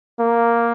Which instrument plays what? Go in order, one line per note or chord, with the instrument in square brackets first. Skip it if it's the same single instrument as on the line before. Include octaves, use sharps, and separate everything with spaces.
[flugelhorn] A#3